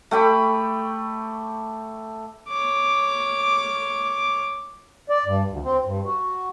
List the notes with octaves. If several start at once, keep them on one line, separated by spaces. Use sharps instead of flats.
A3 G5 B5 D6
C#5 D6
D5
G2
D2
C4
G2
F#4